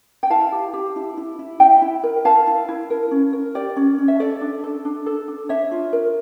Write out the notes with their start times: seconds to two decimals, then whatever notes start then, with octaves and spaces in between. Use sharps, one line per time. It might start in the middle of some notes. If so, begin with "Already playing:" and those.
0.23 G5
0.30 E4 F5 A5
0.52 G4
0.73 G4
0.96 E4
1.17 E4
1.39 E4
1.60 E4 E5 G5
1.82 E4
2.03 A#4
2.25 A#4 F5 A5
2.47 E4
2.69 E4
2.90 A#4
3.11 C#4
3.33 A#4
3.55 G4 D5
3.76 C#4
3.98 C#4
4.08 E5
4.20 A4 D5
4.41 D4
4.64 A4
4.85 D4
5.06 A4
5.28 D4
5.49 D4 C#5 E5
5.72 F4
5.93 A#4